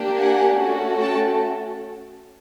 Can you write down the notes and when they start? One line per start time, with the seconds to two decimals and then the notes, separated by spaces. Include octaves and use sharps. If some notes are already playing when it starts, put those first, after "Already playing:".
Already playing: A#3 D4 G4
0.17 F#5 G#5
0.59 A3 C#4 F#4 A4
1.00 G5 A5